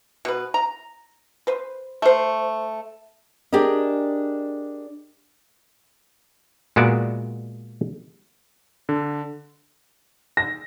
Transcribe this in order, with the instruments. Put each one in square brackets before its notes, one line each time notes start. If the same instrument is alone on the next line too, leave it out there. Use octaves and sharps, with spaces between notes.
[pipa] B2 B4
A#5
B4 C5
A3 C5
[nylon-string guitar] D4 G4 G#4 A#4 D#5
[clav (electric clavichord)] A#2 G#3 B3 F#4 D5 E5
[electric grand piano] D3
[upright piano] A#6